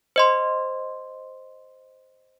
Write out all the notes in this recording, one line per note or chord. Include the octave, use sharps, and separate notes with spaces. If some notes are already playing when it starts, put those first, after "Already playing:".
C5 D#5 C6